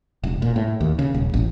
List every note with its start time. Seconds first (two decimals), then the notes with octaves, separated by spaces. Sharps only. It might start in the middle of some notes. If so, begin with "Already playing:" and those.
0.24 E1
0.42 A#2
0.56 A2
0.81 D#2
0.99 C#3
1.14 D#1
1.34 A1